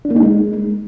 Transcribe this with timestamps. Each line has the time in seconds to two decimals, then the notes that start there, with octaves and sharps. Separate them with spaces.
0.05 D4
0.11 A#3
0.16 D#4
0.22 G#3